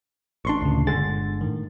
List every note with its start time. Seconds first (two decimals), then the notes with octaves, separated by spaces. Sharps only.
0.45 A1 D4 C6 C#6
0.62 D2 A#2 C#3
0.87 G1 D3 G#3 A6
1.41 A2 D#3